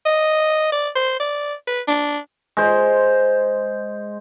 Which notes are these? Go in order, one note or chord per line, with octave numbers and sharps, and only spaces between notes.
D#5
D5
C5
D5
B4
D4
G#3 C5